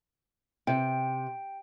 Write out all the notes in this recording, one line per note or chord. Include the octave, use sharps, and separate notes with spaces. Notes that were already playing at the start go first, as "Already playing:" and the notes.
C3 G5